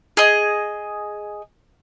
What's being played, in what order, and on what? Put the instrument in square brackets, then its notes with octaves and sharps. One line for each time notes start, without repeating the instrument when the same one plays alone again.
[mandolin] G#4 D#5